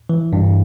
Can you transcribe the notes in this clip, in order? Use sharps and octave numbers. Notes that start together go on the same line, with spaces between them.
E3
G2